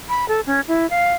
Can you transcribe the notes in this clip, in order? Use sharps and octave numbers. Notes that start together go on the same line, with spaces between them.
B5
A4
C#4
E4
F5